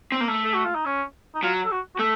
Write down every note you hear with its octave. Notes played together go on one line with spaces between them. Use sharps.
C4
A#3
A3
A4
F#4
F4
D#4
C#4
D#4
F#3 F4
A4
F#4
F#4
A3 A4